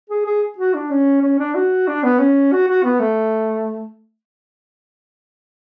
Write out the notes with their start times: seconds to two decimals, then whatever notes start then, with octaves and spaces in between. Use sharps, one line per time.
0.10 G#4
0.26 G#4
0.58 F#4
0.74 D4
0.90 C#4
1.22 C#4
1.39 D4
1.55 F#4
1.87 D4
2.03 B3
2.19 C#4
2.52 F#4
2.68 F#4
2.84 B3
3.00 A3